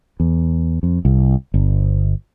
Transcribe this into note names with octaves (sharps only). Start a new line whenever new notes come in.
E2
F2
C2
G1